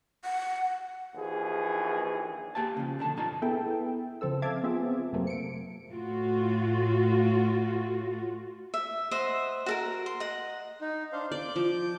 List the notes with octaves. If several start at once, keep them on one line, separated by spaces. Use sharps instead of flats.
F#5
A#1 D#2 E3 G#4
A#3 G4 F5 A5
C#3 F3
B1 D3 A5
G2 B2 D#4 F4 A5 A#5
B3 E4 G#4 A4 E5 G5
C#3 F3 C4 A4 E6
E5 F5 A5 D6 G#6
B3 C4 F4 G#4 E5
F#2 C3 F#3 A3 A#3 C4
C#7 D7
A2 F4 F#4
E5
C5 D#5 E5 F#5
F#4 A4 A#4
C6
D#5 F#5
D#4
D4 C5 F5
D5 D6 G6
F3